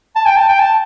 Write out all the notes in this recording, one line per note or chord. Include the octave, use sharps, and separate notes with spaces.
A5
G5
A5
G5
A5